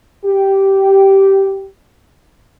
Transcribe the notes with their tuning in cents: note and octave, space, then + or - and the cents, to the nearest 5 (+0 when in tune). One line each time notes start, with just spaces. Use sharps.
G4 -10